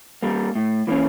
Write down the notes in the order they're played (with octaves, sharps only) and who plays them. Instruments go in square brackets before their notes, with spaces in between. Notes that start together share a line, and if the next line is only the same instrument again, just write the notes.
[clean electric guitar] G3 A#3
A2
E3 A#3 C#4